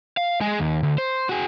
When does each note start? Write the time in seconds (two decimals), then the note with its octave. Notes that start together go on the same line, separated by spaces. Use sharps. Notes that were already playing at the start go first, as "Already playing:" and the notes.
0.17 F5
0.41 G#3 G#4
0.59 D#2
0.83 D2
0.98 C5
1.29 F#4 G#4